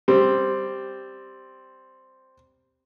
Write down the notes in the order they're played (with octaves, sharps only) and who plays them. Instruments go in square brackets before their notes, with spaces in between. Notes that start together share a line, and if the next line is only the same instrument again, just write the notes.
[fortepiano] G3 C4